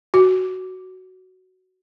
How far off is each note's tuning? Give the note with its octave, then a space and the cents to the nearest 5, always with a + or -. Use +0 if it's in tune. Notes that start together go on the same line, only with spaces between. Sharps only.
F#4 +5